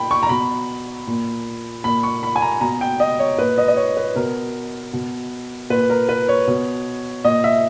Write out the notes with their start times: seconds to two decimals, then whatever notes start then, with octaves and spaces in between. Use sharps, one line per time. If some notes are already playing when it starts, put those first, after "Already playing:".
Already playing: A#2 G5 B5
0.11 C#6
0.23 A#5
0.29 B2 B5
1.07 A#2
1.84 A#2 B5
2.03 C#6
2.23 B5
2.36 G#5
2.42 A#5
2.61 B2 A#5
2.81 G5
3.00 D#5
3.19 C#5
3.38 A#2 B4
3.58 D#5
3.68 D#5
3.77 C#5
3.97 B4
4.16 B2 A#4
4.93 B2
5.70 A#2 B4
5.90 A#4
6.09 B4
6.28 C#5
6.47 B2
7.24 A#2 D#5
7.44 E5